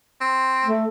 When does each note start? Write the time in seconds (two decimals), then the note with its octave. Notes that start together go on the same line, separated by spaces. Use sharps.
0.21 C4
0.64 A3